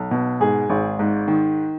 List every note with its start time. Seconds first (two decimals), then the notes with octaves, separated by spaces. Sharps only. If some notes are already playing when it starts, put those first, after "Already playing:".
Already playing: B1
0.11 B2
0.40 G#2 G#4
0.69 G#1
0.99 G#2
1.28 D#3